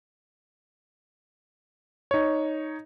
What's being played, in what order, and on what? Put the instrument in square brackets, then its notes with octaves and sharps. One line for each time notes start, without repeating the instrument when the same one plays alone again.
[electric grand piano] D#4 C#5